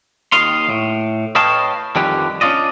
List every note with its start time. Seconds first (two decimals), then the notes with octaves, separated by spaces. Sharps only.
0.32 D#2 D#3 D#5 F5 C6
0.69 A2
1.35 B4 C#5 D#5 F5 G5 A5
1.96 F2 D3 D#3 G3 G4 B4
2.41 C#4 D4 F4 D5 D#5